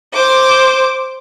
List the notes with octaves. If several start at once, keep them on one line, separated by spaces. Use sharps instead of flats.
C5 D6